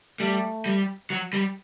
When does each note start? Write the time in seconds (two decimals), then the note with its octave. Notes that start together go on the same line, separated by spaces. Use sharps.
0.20 G3 A3
0.66 G3
1.10 F#3
1.33 G3